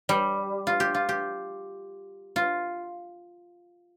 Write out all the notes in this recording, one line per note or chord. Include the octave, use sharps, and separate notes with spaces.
G3
F4
G4
F4
G4
F4